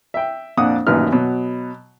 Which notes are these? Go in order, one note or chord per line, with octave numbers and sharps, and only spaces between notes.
E5 G5
F2 A#2 D4 F#5 D#6
A1 F#2 A#2 D#3 B4 F6
B2 F#3